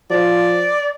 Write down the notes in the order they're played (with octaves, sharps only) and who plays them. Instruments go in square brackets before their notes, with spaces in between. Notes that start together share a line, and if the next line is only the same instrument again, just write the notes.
[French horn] F3 [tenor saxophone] D5